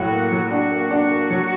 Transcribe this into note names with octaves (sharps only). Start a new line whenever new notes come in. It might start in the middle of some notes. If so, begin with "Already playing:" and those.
Already playing: A2 F#3 F#4
A#3
F#3
D4 F#4
A#3
D4 F#4
A#3
F#3